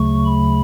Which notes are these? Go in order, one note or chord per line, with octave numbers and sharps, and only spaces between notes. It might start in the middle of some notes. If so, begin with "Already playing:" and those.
Already playing: D2 C#3 F#3 A3 C#6
B5